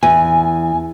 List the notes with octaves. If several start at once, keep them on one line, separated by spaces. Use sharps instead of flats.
E2 G#5